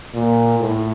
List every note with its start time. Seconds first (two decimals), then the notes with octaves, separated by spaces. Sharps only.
0.14 A#2
0.60 A2